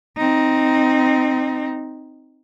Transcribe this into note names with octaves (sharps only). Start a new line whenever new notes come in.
C4 D#4